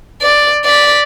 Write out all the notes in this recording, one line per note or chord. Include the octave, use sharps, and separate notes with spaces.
D5
D5 B6